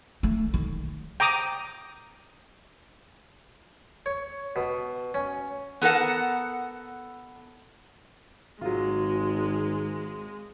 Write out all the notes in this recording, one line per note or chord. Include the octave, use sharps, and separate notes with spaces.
A3
D#3
G5 A#5 D6 D#6
C#5
B2
C#4
B3 A4 A#4 F#5
G#1 F#3 G#3 F4